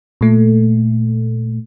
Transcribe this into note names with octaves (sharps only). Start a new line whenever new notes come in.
A#2 A3